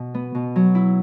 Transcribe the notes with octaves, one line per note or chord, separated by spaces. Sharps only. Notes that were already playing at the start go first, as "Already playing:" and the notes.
Already playing: B2
B3
B2
F#3
E4